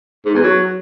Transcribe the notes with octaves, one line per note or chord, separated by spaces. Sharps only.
G#2
E2
F#3